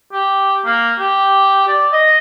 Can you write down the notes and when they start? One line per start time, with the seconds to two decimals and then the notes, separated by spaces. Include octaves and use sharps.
0.13 G4
0.65 A#3
0.99 G4
1.68 D5
1.93 D#5